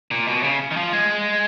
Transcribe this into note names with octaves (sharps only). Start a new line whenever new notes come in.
A#2
B2
C#3
D#3
F3
G#3